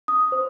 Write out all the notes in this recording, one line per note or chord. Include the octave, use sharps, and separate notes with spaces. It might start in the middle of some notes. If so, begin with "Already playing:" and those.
D#6
C5